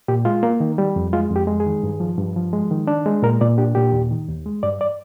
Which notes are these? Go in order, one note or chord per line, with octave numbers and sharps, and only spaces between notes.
A#2 G4
G#3 F4
A#3
D#3
G3
F2
G#3 F4
F2
G4
G#3
G#4
D#3
G2
F3
G2
F3
G#3
D#3
D4
G#3
A#2 A#4
A#2 D5
D4 G4
A#2 G4
D#2
D#3
D#2
G#3
G2 D5
D5